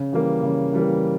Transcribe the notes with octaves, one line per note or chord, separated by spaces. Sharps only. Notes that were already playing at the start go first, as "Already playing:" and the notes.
Already playing: C#3
E3 G3 A#3
C#3
E3 G3 A#3